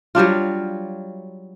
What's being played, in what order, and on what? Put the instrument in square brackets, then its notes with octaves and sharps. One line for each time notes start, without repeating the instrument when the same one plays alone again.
[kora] F#3 G3 D4 F4